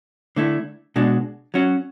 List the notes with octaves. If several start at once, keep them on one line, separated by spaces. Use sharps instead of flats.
D3 A3 E4
B2 G#3 D4 F#4
F#3 C#4 F#4